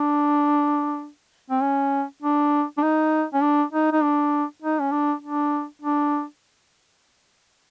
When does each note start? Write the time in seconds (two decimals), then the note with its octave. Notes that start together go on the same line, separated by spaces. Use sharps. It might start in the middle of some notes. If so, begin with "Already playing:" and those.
Already playing: D4
1.51 C4
1.62 C#4
2.22 D4
2.78 D4
2.83 D#4
3.34 C#4
3.42 D4
3.73 D#4
3.93 D#4
4.03 D4
4.62 D#4
4.81 C#4
4.92 D4
5.23 D4
5.82 D4